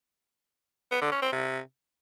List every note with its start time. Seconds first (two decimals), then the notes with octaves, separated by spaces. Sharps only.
0.91 B3
1.02 D3
1.12 C#4
1.22 C4
1.32 C3